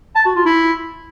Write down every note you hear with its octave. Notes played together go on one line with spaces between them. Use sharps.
A5
F#4
F4
E4